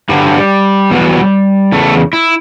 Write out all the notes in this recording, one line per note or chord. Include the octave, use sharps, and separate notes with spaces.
G2 D3 F#3 G3
E2 B2 F#3
E2 C#3 A3
E4